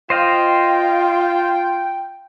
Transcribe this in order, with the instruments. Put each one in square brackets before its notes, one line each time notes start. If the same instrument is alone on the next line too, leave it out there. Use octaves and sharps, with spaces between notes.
[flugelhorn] F4 [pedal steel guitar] C5 D#5 F5 [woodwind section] G5